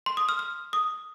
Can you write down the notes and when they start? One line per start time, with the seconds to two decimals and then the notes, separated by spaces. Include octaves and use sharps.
0.06 C6
0.17 D#6
0.29 F6
0.39 F6
0.73 D#6